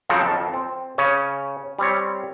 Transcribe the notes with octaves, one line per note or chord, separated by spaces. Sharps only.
C#3 F3 F#3 C4 A4
F2 A5
C4
C#3 C#4
G3 C4 C#5